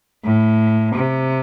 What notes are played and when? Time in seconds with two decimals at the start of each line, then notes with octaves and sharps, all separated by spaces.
0.25 A2
0.95 C3